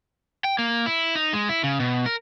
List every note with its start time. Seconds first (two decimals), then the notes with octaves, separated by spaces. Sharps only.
0.44 G5
0.59 A#3
0.86 E4
1.15 D#4
1.33 G#3
1.49 E4
1.63 C#3
1.80 B2
2.06 A#4